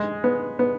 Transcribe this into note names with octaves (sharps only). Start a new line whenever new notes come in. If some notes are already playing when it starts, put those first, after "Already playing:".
Already playing: G#3
B3
B3